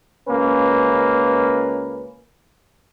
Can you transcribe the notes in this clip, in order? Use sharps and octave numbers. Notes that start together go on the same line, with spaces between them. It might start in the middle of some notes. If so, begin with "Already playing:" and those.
C#2 A#3 C#4 B4